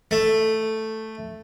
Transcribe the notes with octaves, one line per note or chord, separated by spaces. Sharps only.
A3